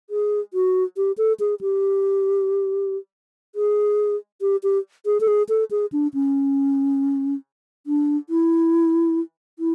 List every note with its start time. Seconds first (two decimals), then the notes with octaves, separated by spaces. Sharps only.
0.10 G#4
0.54 F#4
0.97 G4
1.18 A4
1.40 G#4
1.61 G4
3.55 G#4
4.41 G4
4.63 G4
5.06 G#4
5.20 A4
5.28 G#4
5.49 A4
5.71 G#4
5.92 D4
6.14 C#4
7.87 D4
8.29 E4
9.59 E4